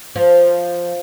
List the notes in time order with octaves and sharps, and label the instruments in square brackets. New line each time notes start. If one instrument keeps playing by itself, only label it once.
[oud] F3